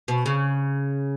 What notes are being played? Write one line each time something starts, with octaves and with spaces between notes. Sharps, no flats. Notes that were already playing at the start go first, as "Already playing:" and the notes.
B2
C#3